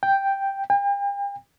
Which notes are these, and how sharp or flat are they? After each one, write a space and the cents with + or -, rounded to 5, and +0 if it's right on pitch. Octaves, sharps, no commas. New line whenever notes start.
G5 +0
G5 +40